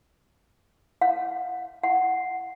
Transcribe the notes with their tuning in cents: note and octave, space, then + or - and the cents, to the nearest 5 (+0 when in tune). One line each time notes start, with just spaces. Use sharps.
F#5 -30
F#5 +0